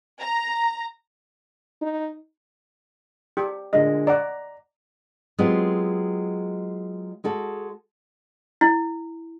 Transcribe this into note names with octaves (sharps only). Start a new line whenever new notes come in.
A#5
D#4
G4
A#2 D3 G#3 D#5
D5 F#5 A#5
F#3 G#3 B3 C4 F4 G4
G#3 F#4 A4
E4